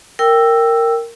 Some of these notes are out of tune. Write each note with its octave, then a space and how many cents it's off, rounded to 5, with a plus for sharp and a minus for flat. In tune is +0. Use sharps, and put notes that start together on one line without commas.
A#4 -10 G5 +0 E6 +5